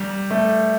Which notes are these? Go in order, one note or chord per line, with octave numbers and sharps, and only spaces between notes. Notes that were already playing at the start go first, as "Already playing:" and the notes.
Already playing: G3
A3